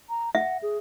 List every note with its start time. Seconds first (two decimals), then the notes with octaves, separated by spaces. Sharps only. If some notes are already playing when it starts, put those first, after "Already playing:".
0.09 A#5
0.35 E5 F#5
0.63 G#4